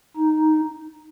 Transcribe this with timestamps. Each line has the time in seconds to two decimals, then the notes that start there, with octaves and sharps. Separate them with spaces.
0.17 D#4